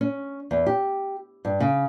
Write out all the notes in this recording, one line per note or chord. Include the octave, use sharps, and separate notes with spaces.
C#4
E2
G4
G2
C#3